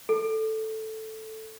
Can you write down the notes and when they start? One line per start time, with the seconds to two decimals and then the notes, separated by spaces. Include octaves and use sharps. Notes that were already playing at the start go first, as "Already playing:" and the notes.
0.09 A4